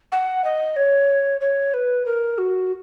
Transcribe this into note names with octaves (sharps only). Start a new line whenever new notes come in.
F#5
D#5
C#5
C#5
B4
A#4
F#4